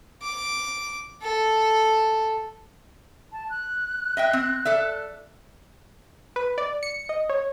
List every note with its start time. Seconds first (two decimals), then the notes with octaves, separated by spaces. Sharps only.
0.23 D6
1.23 A4
3.32 A5
3.49 F#6
4.17 D#5 E5 G5
4.33 C4
4.65 A4 D5 E5
6.36 B4
6.58 D5
6.83 C#7
7.09 D#5
7.29 C#5